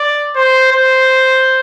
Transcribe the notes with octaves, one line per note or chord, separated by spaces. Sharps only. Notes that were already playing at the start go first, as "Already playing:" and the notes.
Already playing: D5
C5
C5